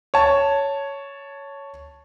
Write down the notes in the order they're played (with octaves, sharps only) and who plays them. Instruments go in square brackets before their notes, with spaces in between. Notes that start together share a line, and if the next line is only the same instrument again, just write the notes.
[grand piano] C#5 A5